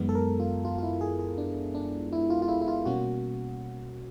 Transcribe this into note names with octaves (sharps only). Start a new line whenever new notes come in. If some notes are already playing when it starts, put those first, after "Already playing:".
Already playing: F#2 D#3 G#3 B3
A4
A#4
F4
F4
F4
E4
G#4
G#4
D4
D4
E4
F4
F4
E4
E4
F4
B2 G3 A#3 C#4 F#4